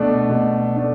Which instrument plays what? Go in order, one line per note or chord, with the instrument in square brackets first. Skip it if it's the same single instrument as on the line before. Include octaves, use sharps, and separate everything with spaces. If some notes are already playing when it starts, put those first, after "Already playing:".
Already playing: [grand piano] B2 A3 D4
B2
A3 D4